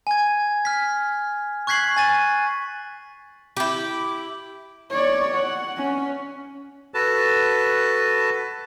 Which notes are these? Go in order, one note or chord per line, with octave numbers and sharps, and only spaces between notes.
G#5 G#6
F6 B6
C#6 F#6 G#6 B6 C7 F#7
G#5 A6 D#7
E4 G4
C#5 D5
F#5
C#4
F#4 A4 B4 A5